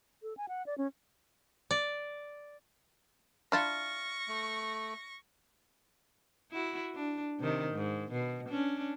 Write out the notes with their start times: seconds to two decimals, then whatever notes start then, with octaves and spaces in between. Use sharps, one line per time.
0.23 A4
0.37 G#5
0.48 F#5
0.66 D5
0.78 C#4
1.71 D5
3.52 D4 E4 F4 C#6 F6 A6 A#6
4.28 A3
6.52 E4 F#4
6.95 D4
7.39 C3 D#3
7.74 G#2
8.11 B2
8.49 C#4 D4